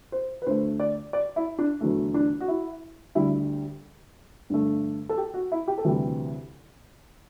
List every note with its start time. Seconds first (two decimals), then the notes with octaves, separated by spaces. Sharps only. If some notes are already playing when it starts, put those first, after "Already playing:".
0.12 C5
0.42 B4
0.46 D2 D3 A3 C5
0.80 D5
1.13 D5
1.36 E4
1.59 D4
1.81 E2 D3 F#3 A3
2.14 D4
2.41 F#4
2.48 E4
3.15 D2 D3 G3 E4
4.50 G2 D3 A3
5.09 A4
5.18 G4
5.34 F#4
5.52 E4
5.68 G4
5.78 A4
5.85 D2 C3 E3 G3 G4